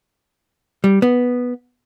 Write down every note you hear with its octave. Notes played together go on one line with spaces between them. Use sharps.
G3
B3